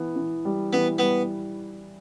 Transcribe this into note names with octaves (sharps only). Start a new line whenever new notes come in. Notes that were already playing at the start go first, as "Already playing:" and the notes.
Already playing: E3 B3
E3
G3
E3 B3
G3 B3